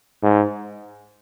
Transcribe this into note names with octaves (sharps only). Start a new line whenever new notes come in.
G#2